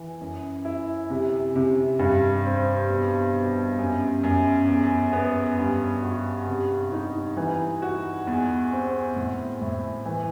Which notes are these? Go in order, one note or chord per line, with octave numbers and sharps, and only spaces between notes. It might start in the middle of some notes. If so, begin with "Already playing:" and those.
Already playing: E3
F#2
E4
C3
C3
G2
C4
B2
B2
F#2
F#2
E2
B3
G2
F#4
C3
D#4
E3
F#4
E2
C4
A2
A2
E3